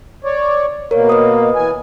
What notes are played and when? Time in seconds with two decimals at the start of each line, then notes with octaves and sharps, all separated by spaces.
0.24 C#5 D5
0.91 B2 A#3 A#4 C#5
1.09 B4 D#5 D#6
1.55 E3 G#5